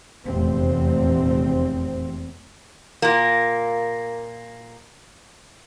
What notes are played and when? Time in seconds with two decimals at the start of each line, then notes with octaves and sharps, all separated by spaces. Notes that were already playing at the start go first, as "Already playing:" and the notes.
0.25 F1 E2 A#2 C4
3.02 A#2 A#3